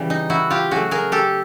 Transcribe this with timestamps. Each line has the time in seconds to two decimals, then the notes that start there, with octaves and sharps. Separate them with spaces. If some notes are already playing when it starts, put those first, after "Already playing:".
Already playing: C#3 E3 G3
0.10 D#4
0.30 E4 F#4
0.50 F4 G4
0.71 C#3 F#3 A3 F#4 G#4
0.91 G#4 A#4
1.12 G4 A4